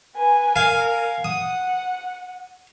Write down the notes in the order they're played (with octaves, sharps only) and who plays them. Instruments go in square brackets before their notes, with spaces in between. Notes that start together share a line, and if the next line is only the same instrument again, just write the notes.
[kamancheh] B4 G#5
[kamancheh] A#4 [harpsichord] F5 G#5
[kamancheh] F#5 [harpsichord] D#6